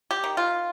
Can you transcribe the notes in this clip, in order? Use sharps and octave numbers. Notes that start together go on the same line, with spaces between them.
G4
D#3
F4